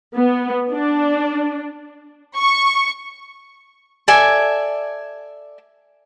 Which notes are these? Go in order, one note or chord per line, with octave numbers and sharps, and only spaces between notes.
B3
D4
C#6
A4 D5 E5 G#5